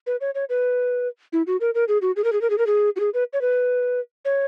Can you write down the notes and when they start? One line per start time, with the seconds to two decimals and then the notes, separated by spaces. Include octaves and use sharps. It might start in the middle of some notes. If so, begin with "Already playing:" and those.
0.07 B4
0.21 C#5
0.35 C#5
0.49 B4
1.33 E4
1.47 F#4
1.61 A#4
1.75 A#4
1.88 G#4
2.02 F#4
2.16 G#4
2.24 A#4
2.33 G#4
2.41 A#4
2.50 G#4
2.58 A#4
2.67 G#4
2.96 F#4
3.00 G#4
3.14 B4
3.33 C#5
3.41 B4
4.25 C#5